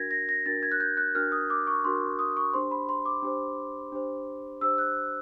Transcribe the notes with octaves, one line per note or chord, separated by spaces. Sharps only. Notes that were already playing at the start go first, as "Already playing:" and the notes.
Already playing: D4 F#4 A#4 G#6 A#6
A#6
A#6
D4 F#4 A#4 A6
G#6
F#6
G6
F#6
D4 F#4 A#4 F6
D#6
D6
C#6
D4 F#4 A#4 C6
D#6
C#6
D4 G4 C5 C6
B5
C6
D6
D4 G4 C5
D4 G4 C5
D4 G4 C5 E6
F#6